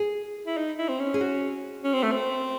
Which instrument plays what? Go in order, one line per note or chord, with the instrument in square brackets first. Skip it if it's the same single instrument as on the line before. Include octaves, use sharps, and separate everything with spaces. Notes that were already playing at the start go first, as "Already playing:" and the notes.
Already playing: [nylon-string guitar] G#4
[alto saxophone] E4
D#4
E4
C4
C#4
[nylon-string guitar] G#4
F#4
[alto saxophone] C#4
C4
A3
C4